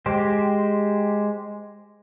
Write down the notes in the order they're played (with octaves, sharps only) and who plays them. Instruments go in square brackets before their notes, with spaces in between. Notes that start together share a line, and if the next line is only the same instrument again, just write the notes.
[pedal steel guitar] G#3 G4 C5